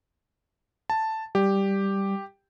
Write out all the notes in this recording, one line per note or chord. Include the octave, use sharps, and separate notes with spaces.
A5
G3 G4